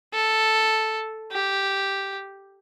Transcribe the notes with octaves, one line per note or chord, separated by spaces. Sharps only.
A4
G4